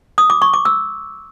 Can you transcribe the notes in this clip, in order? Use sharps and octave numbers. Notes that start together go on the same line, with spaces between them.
D#6
D6
C#6
D6
E6